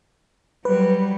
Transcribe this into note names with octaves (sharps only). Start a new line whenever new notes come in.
F#3 G3 B4